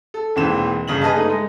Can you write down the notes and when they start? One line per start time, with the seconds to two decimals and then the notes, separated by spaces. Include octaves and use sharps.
0.14 A4
0.36 E1 D#2 E3 C4 B4 E7
0.87 G1 C#3 F#7
1.01 G#4 B4 D#5 A5
1.14 G2 A3 D#4
1.29 G#3